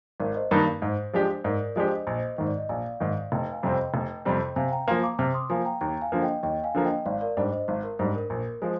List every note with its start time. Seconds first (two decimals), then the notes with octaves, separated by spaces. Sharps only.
0.20 G#1 A#4 D5
0.35 C5 D#5
0.51 G2 D#3 A#3 D#4 A#4 D5
0.82 G#2 C5
1.13 F3 G#3 D4 G4
1.44 G#2 A#4 D5
1.75 F3 G#3 D4 G4 C5 D#5
2.07 A#1 C5 D#5
2.37 G#2 D#3 C5
2.47 D5
2.58 D#5
2.69 A#1 D5 F5
3.00 G#2 D#3
3.32 F1 D#5 G5
3.52 F5 G#5
3.63 F2 C3 G3 C4
3.73 D#5 G5
3.94 F1
4.25 F2 C3 G3 C4
4.56 C3 F5 G#5
4.72 G5 A#5
4.87 F3 A#3 G#5 C6
5.03 A#5 D6
5.19 C3 D6 F6
5.34 C6 D#6
5.50 F3 A#3 F5 G#5
5.65 G5 A#5
5.81 D#2 G5 A#5
6.02 F5 G#5
6.12 D3 F3 A#3
6.22 D#5 G5
6.43 D#2 D#5 G5
6.64 F5 G#5
6.75 D3 F3 A#3
6.85 D#5 G5
7.06 G#1 D5 F5
7.21 A#4 D5
7.37 G#2 G3 D4 C5
7.53 C5 D#5
7.68 G#1 C5
7.83 A#4
7.99 G#2 G3 D4 C5
8.15 A#4
8.30 A#1 A#4
8.62 F3 G#3 C5